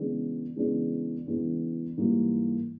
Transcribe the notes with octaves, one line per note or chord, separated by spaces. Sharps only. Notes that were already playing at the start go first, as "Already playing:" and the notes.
Already playing: C#3 E3 G#3 B3 D4
C#3 E3 G#3 B3 D4
C#3 E3 G#3 B3 D4
G#2 E3 G3 A#3 D#4